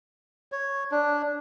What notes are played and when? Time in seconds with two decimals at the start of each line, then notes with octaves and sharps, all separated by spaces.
0.52 C#5
0.91 D4